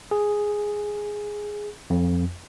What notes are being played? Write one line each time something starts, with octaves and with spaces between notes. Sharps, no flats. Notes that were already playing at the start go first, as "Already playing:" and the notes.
G#4
F2